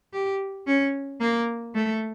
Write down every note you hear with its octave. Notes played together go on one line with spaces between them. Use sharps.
G4
C#4
A#3
A3